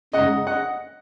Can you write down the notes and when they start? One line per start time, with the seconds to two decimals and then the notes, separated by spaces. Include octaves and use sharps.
0.13 F#2 C#3 G#3 D#4 D#5 F#5
0.47 D#5 F#5